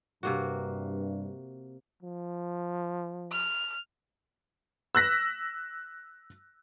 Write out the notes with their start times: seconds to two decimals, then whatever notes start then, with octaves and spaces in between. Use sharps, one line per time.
0.23 G2 C3 A#3 F#4
2.02 F3
3.31 F6
4.95 E6 F#6 A#6 B6